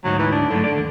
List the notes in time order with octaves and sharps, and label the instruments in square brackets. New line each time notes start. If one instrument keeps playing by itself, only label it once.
[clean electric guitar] D2 G#2 D#4 [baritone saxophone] F#3
[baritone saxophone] E3
D4
[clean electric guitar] G2 F#3 A3 [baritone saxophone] D3
[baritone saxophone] D3 [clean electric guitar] D5
[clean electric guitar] D#2